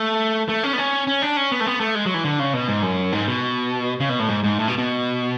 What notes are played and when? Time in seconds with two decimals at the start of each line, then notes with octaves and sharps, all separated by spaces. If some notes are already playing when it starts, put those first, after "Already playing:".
Already playing: A3
0.49 A3
0.63 C#4
0.73 B3
0.78 C#4
1.07 C#4
1.22 D4
1.37 C#4
1.52 B3
1.60 A3
1.66 B3
1.80 A3
1.95 G#3
2.05 F#3
2.14 E3
2.24 D3
2.39 C#3
2.53 B2
2.68 G#2
2.83 F#2
3.12 G#2
3.27 B2
4.00 C#3
4.09 B2
4.19 A2
4.29 G#2
4.44 G#2
4.59 A2
4.68 B2
4.78 B2